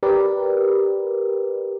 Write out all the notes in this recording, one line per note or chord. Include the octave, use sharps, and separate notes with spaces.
G4 A#4 B4 D5